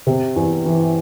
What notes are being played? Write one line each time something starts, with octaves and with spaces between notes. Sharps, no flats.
C3
E2
E3